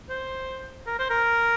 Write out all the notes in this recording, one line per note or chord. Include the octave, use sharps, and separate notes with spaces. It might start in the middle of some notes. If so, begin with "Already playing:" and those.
C5
A#4
C5
A#4